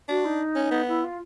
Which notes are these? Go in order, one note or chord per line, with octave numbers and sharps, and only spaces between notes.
D4 F#4
D#4
C#4
B3
E4
F4